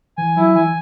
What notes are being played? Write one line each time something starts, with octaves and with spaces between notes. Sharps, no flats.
E3 G#5
F#3 E4
E3 G#5